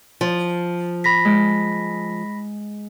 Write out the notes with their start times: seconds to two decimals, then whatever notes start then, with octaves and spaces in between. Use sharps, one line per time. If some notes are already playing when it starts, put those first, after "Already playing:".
0.21 F3
1.04 B5 A#6 B6
1.25 G#3